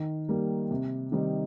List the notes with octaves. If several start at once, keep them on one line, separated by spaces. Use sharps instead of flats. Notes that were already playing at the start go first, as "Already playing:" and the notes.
Already playing: D#3
G3 A#3
C3
D#3 G3 C4 D#4